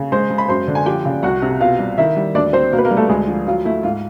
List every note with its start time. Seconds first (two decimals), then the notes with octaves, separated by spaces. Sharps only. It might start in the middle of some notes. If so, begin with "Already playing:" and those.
Already playing: C#3
0.12 G#3 C5 C6
0.30 G#3
0.38 B5
0.48 F#2 C5 C6
0.68 D3
0.75 G#5
0.86 F3 G4 G5
1.05 C#3
1.23 C2 F#4 F#5
1.42 C3
1.60 B2 F4 F5
1.79 G3
1.98 D#3 E4 E5
2.16 G3
2.34 D2 D4 D5
2.53 F#3 C4 C5
2.72 B2 A#3 A#4
2.78 B4
2.84 A#3 A#4
2.91 G3
2.97 A3 A4
3.09 D2 G#3 G#4
3.28 F3
3.47 F#3 F4
3.65 A3 E4
3.83 G#2 F4